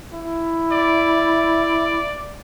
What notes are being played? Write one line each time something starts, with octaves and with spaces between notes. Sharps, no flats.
E4
D5